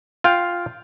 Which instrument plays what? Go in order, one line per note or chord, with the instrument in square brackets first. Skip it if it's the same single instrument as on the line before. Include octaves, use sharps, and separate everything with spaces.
[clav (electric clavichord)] F4 F5 G5